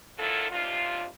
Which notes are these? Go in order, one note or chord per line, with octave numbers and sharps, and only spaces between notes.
D2 D#3 F#3 E4 F4 A4
D#2 C3 D4 F4